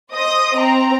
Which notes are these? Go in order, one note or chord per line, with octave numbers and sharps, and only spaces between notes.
C5 D#5 D#6 A#6
C4 A#5